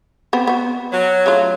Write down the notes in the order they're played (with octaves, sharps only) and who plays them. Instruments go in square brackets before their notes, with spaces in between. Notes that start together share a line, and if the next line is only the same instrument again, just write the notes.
[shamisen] B3 C4
B3 F#4
[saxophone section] F#3
[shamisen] C#3 A3 F4